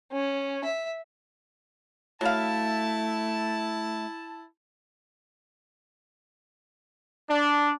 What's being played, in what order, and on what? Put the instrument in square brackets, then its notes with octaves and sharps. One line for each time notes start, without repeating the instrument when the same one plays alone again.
[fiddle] C#4
E5
[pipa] F#3 F5 [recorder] A3 [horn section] E4 A5
[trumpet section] D4